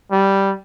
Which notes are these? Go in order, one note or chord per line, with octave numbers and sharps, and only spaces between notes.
G3